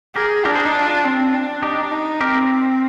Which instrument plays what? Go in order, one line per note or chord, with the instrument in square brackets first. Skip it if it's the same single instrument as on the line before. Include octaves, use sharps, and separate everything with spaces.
[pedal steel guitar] G4 A#4 [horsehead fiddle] G#4
[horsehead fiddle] D4 [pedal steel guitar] G4 A#4
[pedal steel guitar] G#4 C5
D#4
F4
[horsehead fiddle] C4
D4
[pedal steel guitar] D#4 G4
[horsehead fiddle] D#4
[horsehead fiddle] C4 [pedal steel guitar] G4 A#4